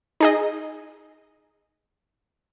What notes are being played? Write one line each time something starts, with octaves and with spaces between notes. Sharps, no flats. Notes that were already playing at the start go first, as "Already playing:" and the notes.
D#4 G#4 D#5